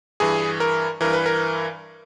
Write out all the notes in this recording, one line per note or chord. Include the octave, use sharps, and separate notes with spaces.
G2 E3 G#4
A#4
G2 E3 A#4
B4
A#4